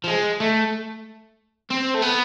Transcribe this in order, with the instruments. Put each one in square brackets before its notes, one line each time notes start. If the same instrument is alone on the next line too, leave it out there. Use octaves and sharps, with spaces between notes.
[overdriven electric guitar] F3
G#3
A3
C4
A3
B3